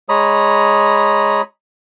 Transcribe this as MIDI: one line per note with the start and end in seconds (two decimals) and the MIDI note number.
0.09 1.41 56
0.09 1.41 73
0.09 1.41 82
0.09 1.41 83
0.09 1.41 87